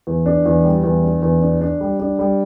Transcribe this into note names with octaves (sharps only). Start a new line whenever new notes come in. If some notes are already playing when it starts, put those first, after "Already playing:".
E2
D4
E2
G3
E2
D4
E2
D4
D4
G3
D4
G3